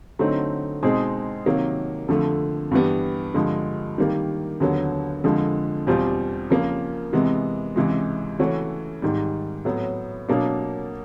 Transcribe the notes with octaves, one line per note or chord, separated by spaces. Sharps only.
D3 F#3 A3 C4 D#4
B2 G#3 C4 D#4 G#4
C3 D#3 F#3 A#3
F2 D3 F3 A3
G2 E3 G3 B3
G2 D3 F3 G#3
D#3 G3 A#3
D#2 D3 F#3 B3
F2 D3 F3 G#3
E2 B2 G3 C4 F4
C#3 F3 A#3
C3 E3 G#3 B3
C#2 C3 E3 G#3
C#3 E3 A3 C#4 F#4
G#2 D#3 G3
A2 F#3 B3
B2 F#3 A#3 D4